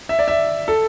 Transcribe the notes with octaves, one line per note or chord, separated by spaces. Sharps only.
E5
D5
E5
A4